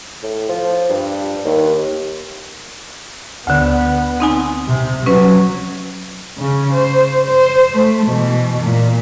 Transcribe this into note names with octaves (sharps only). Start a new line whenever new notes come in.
A2
F3
G2
D#2
D2 D3 B3
C4 D#4 G#5
C3
F#3 C#4 B4
C#3 C#4
C5
C5
A3
B2 E3
A#2